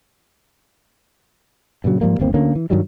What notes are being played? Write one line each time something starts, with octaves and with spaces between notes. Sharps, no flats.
G2 A#2 C#3 F#3
G#2 F3 G3 A#3
G1 D#2 A#3 C4
D2 D3 A#3 C#4
E3
G2 D#3 F#3 G3